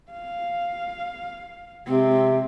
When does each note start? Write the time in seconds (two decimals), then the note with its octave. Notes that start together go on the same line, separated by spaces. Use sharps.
0.12 F5
1.86 C3 G#3 C4